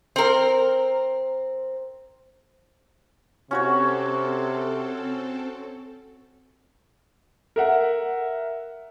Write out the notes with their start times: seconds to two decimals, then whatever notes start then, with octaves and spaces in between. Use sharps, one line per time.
0.16 C4 A#4
3.51 C3 C4 C#4 F#4 A4 C#5
7.56 A#4 E5 F#5